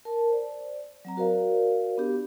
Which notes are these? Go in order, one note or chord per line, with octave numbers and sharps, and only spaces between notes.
A#4 A5
C5 D5
F#3 C4 A#5
F#4 A#4 C5 D5 F5
B3 D4 G4